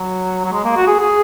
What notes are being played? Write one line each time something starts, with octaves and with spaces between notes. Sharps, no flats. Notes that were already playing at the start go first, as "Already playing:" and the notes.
Already playing: F#3
F#3
G#3
A#3
F#4
G#4
G#4